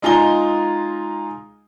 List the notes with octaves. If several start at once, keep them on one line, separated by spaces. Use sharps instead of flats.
G#3 D#4 F4 G#5 A#5 G7